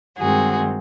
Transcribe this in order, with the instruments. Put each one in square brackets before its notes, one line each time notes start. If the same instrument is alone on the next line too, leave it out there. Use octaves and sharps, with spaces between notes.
[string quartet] G2 D#3 G#3 C4 F#4 G#4